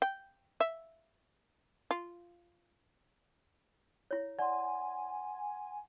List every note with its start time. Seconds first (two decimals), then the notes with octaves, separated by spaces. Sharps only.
0.02 G5
0.60 E5
1.91 F4
4.11 E4 C#5
4.39 D5 F#5 G#5 C6